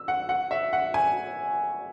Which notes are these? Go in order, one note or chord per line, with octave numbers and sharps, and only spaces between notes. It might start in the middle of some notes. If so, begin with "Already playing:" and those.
Already playing: E6
F#5
F#5
E5
F#5
G#5